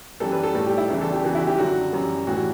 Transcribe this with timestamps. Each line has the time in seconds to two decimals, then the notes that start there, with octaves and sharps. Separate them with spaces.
0.20 F#2 E3 G3 A4
0.32 B4
0.43 A4
0.55 A2 G3 A4
0.66 G4
0.78 E4
0.89 E2 C#3 E3 D4
1.01 A4
1.12 G4
1.23 E2 C#3 E3 G3 F#4
1.35 E4
1.47 G4
1.58 F#2 D3 F#3 F#4
1.93 F#2 E3 G3
2.27 A2 E3 G3 F#4